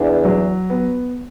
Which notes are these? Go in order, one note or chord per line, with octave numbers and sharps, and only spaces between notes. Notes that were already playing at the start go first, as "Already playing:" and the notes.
Already playing: E2 D4
F#3
B3